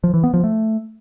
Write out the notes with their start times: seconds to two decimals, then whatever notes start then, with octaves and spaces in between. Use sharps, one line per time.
0.04 F3
0.14 E3
0.24 B3
0.34 F3
0.44 A3